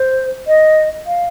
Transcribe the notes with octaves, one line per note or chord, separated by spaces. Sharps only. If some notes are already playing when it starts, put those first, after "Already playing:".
Already playing: C5
D#5
F5